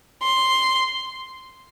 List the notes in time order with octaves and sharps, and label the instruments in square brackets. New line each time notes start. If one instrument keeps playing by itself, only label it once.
[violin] C6